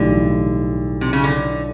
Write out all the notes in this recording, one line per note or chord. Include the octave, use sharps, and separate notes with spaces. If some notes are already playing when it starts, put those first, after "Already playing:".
Already playing: B1 A2 D3 E3 G3
C3
C#3
D3